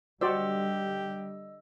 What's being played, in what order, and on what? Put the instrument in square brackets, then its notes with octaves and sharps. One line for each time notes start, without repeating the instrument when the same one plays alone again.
[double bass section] D3 G3 [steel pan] F#4 C5 D5 [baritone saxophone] G4 [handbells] D#5 E6